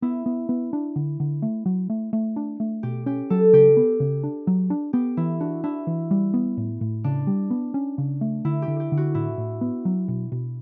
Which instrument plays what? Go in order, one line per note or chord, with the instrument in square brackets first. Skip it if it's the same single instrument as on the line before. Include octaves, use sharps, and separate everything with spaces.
[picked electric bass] B3 [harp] E4
[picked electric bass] B3
B3
D4
D3
D3
A3
F#3
A3
A3
D4
A3
[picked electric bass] B2 [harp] G4
[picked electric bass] C#4 [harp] G4
[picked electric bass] F#3 [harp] A4
[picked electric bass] C#3 [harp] G4
[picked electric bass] B3
C#3
D4
F#3
D4
[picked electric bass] B3 [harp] G4
[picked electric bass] E3 [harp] E4
[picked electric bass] D4 [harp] F#4
[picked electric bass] D4 [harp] E4
[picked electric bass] E3
G3
B3
A2
A2
[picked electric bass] C#3 [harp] D4
[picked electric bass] G3
B3
C#4
C#3
A3
[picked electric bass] D3 [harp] E4
[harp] G4
[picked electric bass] D3
[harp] G4
[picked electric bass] D3
[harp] F#4
[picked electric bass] A2 [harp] E4
[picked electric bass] A2
B3
F#3
B2
B2